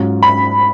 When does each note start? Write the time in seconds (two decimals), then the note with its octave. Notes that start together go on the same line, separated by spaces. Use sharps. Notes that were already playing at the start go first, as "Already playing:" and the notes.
Already playing: G#2 F#3 C#4 F4
0.23 B5